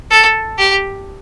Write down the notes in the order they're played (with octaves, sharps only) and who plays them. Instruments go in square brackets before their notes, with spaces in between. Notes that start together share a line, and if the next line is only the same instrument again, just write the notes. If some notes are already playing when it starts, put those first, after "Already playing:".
[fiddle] A4
G4